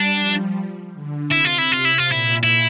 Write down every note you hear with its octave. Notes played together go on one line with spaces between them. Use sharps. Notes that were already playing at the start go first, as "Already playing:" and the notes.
Already playing: G3 D4
F3
D3
C3 E4
F4
E4
F4
E4
F4
A#2 E4
E4